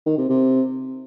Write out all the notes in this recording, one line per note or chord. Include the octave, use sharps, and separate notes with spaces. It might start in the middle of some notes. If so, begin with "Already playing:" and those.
D#3
C3
C3